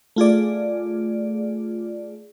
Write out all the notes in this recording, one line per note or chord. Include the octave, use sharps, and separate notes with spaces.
A3 F4 G#4 D5